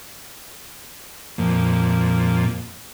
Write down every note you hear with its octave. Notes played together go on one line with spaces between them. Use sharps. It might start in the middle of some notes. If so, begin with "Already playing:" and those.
F2 A#2